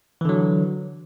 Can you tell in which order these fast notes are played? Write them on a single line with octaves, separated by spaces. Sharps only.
E3 D3 F#3